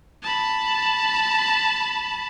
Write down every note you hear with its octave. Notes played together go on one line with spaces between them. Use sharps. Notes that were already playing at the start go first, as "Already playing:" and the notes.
A5 B5